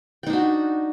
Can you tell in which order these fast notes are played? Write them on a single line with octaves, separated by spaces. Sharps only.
G5 D#4 D4 F#4